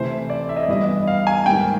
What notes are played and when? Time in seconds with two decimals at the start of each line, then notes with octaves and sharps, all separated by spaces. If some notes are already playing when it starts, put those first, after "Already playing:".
Already playing: C3 E3 A3 C5
0.30 D5
0.49 E5
0.56 D#5
0.63 D5
0.69 G2 E3 G3 B3 D#5
1.07 F5
1.27 G#5
1.46 G#2 D#3 G3 A#3 G5